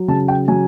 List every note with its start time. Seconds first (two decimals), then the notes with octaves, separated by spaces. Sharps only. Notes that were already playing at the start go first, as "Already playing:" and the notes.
Already playing: F#3
0.08 C#3 A5
0.28 G5
0.48 F#3 G#5